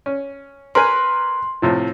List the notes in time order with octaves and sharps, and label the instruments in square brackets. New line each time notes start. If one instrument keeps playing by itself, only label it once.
[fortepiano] C#4
[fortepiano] A#4 B4 G#5 [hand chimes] C6
[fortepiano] A2 C3 F3